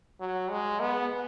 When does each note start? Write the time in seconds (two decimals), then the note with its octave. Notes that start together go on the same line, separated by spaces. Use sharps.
0.20 F#3
0.51 G#3
0.80 B3